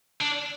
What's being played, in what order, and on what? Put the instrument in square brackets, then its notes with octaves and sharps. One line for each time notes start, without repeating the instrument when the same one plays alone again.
[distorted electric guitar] D4